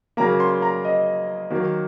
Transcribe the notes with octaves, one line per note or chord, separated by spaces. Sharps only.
C#3 F#3 A#3 A#5
C6
A#5
D#5
D#3 F#3 A#3